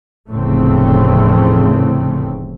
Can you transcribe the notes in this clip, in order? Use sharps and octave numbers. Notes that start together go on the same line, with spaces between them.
F1 E2 A2 C#3 A3 C4